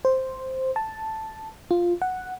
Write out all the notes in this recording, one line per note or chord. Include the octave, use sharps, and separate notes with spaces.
C5
A5
F4
F#5